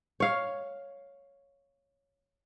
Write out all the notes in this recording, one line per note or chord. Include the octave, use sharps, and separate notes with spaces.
C#5 F5